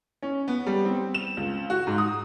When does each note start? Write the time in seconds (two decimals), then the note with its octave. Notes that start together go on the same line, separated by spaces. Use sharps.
0.22 C#4
0.48 B3
0.66 G3
0.85 C4
1.14 E7
1.37 C#2
1.70 F#4
1.87 G#2
1.98 D#6